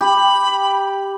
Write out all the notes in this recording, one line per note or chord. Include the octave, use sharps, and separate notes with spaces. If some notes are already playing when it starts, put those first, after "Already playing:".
G4 B5